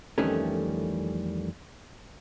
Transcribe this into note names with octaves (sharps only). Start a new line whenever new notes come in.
F2 D#3 E3 G3 A3 C#4